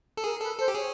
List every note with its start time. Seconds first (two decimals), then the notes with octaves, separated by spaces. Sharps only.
0.17 A4
0.24 G#4 A#4
0.41 A4 B4
0.58 A4 C5
0.68 G4
0.74 G#4 C#5